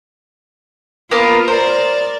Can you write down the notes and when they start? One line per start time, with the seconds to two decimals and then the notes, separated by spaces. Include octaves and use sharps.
1.11 A#3 B3 F4 A#4
1.48 A#4 C5 D5